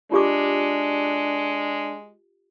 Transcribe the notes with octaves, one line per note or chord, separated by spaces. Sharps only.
G#3 D4 F4 G4 D6